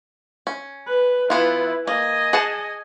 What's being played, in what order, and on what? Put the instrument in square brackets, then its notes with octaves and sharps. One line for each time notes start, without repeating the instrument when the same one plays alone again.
[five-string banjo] C#4
[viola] B4
[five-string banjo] E3 B3 F4 [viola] E4 B4
[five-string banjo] A#3 [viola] D#5 G#5
[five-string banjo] G#4 F#5 A5